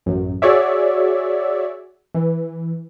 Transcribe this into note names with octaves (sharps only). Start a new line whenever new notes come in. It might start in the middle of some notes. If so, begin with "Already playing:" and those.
A1 F#2
F#4 G#4 C#5 D5 E5
E3